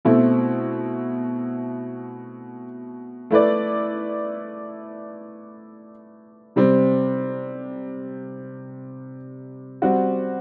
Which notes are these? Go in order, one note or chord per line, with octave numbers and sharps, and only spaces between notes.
B2 A3 C4 E4
A3 E4 B4 D5
C3 G3 C4
G3 C4 F#4